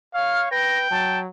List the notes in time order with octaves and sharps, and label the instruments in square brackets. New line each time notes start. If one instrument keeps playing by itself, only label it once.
[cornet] C#5 [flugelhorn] F5 [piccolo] F6
[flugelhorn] B4 [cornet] G5 [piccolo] A#6
[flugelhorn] F#3 [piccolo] A5